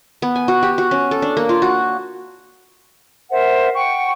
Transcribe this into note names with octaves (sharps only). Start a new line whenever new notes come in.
B3
G#5
F#4
G4
F#4
C#4
A4
D4
A#3
F4
F#4
A#4 C5 E5 F#5
F#5 G5 C#6